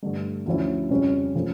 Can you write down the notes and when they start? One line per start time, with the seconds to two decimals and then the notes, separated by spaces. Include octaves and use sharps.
0.03 G2 D3 A3
0.46 D2 D3 F3 C#4 E4
0.90 F2 C#3 G3 C#4 F4
1.35 C#3 F3 A3 C#4